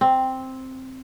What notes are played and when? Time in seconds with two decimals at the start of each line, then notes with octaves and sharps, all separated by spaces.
0.01 C4